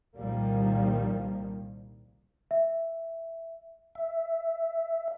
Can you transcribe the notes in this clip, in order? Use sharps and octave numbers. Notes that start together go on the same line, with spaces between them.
C2 A#2 D#3 F3 G3 A#3
E5
E5